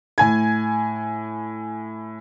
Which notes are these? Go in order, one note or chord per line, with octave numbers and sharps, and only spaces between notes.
A2 G#5 G#6